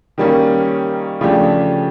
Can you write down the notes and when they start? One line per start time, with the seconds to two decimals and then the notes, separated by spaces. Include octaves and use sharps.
0.18 D#3 G3 A#3 C#4
1.21 C#3 F3 A3 D4 G4